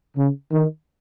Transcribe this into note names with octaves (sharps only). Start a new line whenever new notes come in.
C#3
D#3